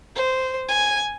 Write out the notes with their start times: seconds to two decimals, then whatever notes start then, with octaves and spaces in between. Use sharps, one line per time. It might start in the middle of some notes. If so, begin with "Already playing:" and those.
0.16 C5
0.69 G#5